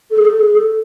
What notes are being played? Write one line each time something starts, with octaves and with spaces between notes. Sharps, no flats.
A4
G#4
A4
G#4
A4